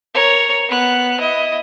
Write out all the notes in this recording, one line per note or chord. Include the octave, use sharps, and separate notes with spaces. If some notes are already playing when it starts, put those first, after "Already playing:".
A#4 C#5
B3 F#6
E4 D#5